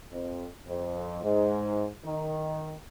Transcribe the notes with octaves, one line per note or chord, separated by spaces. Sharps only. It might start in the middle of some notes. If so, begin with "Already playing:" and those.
F2
F2
G#2
D#3